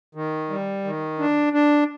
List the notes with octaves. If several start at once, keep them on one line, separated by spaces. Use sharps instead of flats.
D#3
G3
D#3
D4
D4